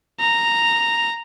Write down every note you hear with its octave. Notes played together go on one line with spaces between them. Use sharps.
A#5